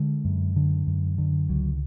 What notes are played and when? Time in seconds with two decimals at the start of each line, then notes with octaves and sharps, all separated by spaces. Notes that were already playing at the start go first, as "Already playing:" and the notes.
Already playing: D3 G#3
0.25 F#2
0.56 D3
0.87 F#2
1.18 D3
1.49 C#2 F#3